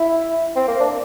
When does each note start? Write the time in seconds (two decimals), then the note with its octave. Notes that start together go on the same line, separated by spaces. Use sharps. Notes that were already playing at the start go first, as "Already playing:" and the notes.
Already playing: E4
0.56 C4
0.68 A#3
0.80 D4